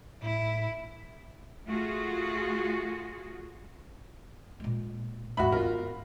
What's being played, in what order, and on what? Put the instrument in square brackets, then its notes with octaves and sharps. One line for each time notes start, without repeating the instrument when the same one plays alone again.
[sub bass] A2 [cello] E4
[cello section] A3 F4 F#4 G#4
[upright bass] A#2 G#3
[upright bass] D#2 G#2 [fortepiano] F#4 E5 B5
[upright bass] G2 B3 [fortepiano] F4 A#4